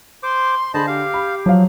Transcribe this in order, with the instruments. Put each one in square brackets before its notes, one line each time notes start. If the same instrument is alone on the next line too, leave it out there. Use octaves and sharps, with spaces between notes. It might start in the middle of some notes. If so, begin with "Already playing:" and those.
[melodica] C5 D6 [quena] C6
[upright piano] D3 G#4 [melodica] C5 D#5 A5 [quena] B5
[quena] G4 [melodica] F5
[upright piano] B5
[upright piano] F3 F5 [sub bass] F#3